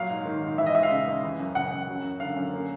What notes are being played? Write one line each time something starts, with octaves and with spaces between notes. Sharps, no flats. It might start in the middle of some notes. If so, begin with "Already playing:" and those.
Already playing: A#2 F#3 F5
G#2
D#3
G#2
E3 E5
D#5
G#3 E5
F5
C#3
D#2
E3
F#2
C#3 F#5
F#2
F#3
F#2
D3 F5
F#2
A#3